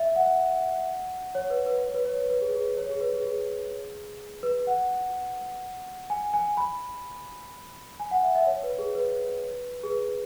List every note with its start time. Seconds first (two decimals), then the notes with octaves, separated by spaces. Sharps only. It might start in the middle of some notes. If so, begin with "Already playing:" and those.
Already playing: E5
0.16 F#5
1.35 C#5
1.50 B4
1.66 B4
1.83 C#5
1.95 B4
2.05 C#5
2.18 B4
2.30 B4
2.42 G#4
2.53 G#4
2.65 B4
2.77 C#5
2.89 G#4
3.01 B4
3.13 G#4
3.25 G#4
4.43 B4
4.67 F#5
6.10 G#5
6.34 G#5
6.57 B5
8.00 G#5
8.11 F#5
8.23 E5
8.35 E5
8.47 C#5
8.63 B4
8.79 G#4
8.95 B4
9.84 G#4
9.90 B4